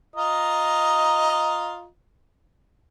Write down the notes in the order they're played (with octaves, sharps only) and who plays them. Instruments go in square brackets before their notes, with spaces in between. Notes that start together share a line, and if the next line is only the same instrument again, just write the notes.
[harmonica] F4 D#5 A#5